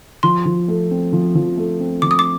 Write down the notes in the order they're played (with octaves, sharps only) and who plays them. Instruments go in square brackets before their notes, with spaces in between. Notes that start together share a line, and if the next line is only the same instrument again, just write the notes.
[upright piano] F3 [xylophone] C6
[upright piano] F3
A3
C4
F3
F3
A3
C4
[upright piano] F3 [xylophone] D6
[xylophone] D#6
D6